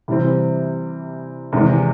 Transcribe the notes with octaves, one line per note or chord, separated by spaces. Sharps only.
C3 E3 G3 C4
E2 C3 D#3 G#3